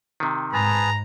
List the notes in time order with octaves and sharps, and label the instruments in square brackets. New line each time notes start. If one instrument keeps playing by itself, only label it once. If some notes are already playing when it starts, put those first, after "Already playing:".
[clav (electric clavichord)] C3 D#3
[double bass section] G#2 [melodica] G#4 B4 A5 [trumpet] A#5